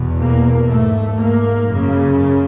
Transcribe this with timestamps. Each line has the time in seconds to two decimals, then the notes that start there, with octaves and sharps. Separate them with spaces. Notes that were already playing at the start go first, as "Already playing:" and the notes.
Already playing: E2 B2
0.20 A#3
0.69 G#2 A3
1.19 A#3
1.68 F#2 C#3